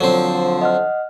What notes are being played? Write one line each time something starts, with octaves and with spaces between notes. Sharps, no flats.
D3 F3 F#3 C4
D#5 F#5 F6